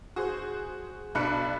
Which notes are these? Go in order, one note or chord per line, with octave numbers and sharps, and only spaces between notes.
F#4 G#4 C5
B1 D4 B5 F#6 C#7